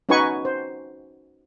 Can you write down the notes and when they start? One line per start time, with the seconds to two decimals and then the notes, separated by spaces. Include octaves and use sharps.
0.09 C#4 D#4 F#4 B4 G#5 C#6
0.45 C5